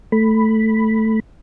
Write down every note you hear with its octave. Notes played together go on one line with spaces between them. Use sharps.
A3 B5